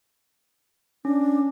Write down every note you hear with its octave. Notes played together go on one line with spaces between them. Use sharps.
C#4 D4